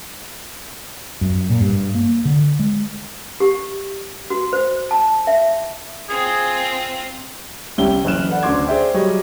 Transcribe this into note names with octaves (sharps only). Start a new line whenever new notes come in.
F#2
A#2
G2
A#3
D3
G#3
G4
F#4
C5
A5
E5
C4 F4 G#4
C2 C#4 E4 G4 G7
F#1 E3 C#4 F6 F#6 E7
A4 B4 D5 F#5
D2 C#3 D5 C6 D6 G#6
G#4 C5 D5 E5 G5
F#3 G3 G#4 C#5 D#5